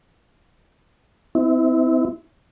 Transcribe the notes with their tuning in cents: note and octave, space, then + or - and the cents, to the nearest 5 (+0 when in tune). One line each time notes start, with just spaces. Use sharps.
C4 -35 E4 -30